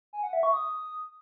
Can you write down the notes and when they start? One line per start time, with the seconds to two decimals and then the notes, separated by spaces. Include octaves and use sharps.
0.13 G#5
0.23 F#5
0.33 E5
0.43 C#6
0.53 D#6